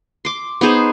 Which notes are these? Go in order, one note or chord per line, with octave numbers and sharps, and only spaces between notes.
C6 D6
B3 D#4 G#4 C5